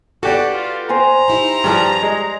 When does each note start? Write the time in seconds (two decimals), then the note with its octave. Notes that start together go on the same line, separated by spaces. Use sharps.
0.23 B3 D4 F#4 G4 A4 D5
0.54 F4
0.89 C5 G5 G#5 A#5
1.28 D#4 E4 G4
1.64 G2 F3 G4 G#4 D5
2.03 G#3